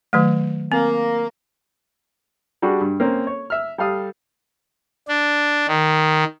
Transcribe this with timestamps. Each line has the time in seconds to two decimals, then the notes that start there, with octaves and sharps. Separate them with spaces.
0.13 D#3 F#3 A3
0.72 A#3 C4
2.62 G3 D4 F#4 G#4
2.81 G2
3.00 A#3 C4 C#4
3.27 C#5
3.50 E5 F6
3.78 G3 A4 F5 D#6
5.08 D4
5.68 D#3